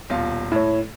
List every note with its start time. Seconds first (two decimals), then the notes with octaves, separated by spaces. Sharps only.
0.10 D#1 B2 F4
0.52 A2 E4 C#5